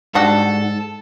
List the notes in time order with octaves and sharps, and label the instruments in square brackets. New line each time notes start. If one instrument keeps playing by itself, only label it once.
[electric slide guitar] G#2 [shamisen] G3 D4 F#4 [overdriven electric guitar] A4